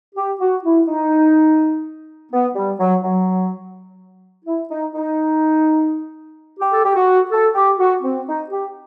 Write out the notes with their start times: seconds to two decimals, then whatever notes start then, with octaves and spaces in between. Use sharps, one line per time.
0.15 G4
0.40 F#4
0.64 E4
0.88 D#4
2.31 B3
2.54 G3
2.78 F#3
3.02 F#3
4.45 E4
4.69 D#4
4.93 D#4
6.59 G4
6.73 A4
6.84 G4
6.95 F#4
7.31 A4
7.54 G4
7.78 F#4
8.03 C4
8.27 D#4
8.50 G4